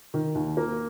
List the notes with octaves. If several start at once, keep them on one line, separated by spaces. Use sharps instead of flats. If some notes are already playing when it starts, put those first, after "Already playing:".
D#3
D#2
A#3